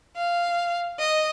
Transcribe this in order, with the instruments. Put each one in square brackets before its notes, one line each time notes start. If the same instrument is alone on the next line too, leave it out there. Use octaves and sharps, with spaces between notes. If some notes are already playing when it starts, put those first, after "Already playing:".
[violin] F5
D#5